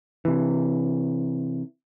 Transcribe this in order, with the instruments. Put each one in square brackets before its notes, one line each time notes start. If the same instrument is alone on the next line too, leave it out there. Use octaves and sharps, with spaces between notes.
[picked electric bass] C3 E3